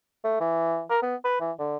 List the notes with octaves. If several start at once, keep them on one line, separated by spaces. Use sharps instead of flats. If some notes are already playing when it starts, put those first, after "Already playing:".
A3
E3
A#4
B3
B4
E3
D3